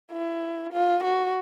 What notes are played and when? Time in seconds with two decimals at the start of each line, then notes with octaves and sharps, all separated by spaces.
0.12 E4
0.73 F4
1.04 F#4